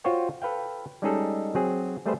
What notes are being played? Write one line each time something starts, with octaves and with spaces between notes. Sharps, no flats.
F4 F#4 C5 C#5 G5
A4 B4 F5 G5
G3 G#3 C#4 D#4 G#4 A4
F#3 C4 G#4
G3 A3 G#4 B4 C5